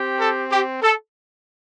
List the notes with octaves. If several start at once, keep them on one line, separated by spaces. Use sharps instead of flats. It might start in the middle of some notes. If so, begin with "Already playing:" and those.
Already playing: C4 G4
A4
G4
A4